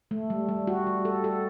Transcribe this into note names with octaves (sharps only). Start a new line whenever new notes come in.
A3
G3
G3
F#4
G3
A4
A4